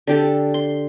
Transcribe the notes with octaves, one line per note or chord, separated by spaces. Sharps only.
D3 G4 A4
C6